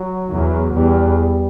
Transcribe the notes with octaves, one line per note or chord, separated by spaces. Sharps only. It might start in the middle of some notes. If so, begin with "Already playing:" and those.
Already playing: F#3
E2
E2 G3
G3